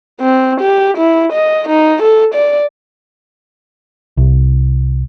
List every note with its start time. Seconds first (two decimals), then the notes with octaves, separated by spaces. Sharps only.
0.21 C4
0.61 G4
0.97 E4
1.33 D#5
1.69 D#4
2.02 A4
2.34 D5
4.17 C2